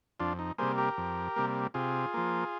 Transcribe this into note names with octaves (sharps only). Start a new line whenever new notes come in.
F2 D4 F4
D#4
C3 G3 A#3 G#4 C5
G4 A#4
F2
C3 G3 A#3
C3 F4 G#4
F3 A#3